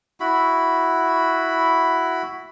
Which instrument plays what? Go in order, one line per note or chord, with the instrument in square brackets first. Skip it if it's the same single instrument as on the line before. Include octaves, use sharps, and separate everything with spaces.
[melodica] E4 F#4 B5